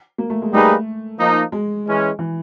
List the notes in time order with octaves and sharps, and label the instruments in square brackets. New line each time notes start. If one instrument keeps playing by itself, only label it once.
[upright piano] A#3
A3
G#3
[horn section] G3 A#3 D#4 G#4 B4 [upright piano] A3
[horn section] F3 A#3 D#4
[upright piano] G#3
[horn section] E3 G#3 C#4
[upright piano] E3